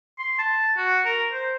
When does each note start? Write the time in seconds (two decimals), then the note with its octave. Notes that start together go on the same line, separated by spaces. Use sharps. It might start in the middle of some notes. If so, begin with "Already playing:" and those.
0.19 C6
0.38 A5
0.77 F#4
1.05 A#4
1.32 C5